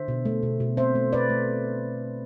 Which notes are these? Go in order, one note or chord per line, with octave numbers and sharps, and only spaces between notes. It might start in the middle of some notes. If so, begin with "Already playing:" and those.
Already playing: D3 C5 E5
B2
A3
B2
B2
C4 C5 E5
A3
A3 B4 D5
A3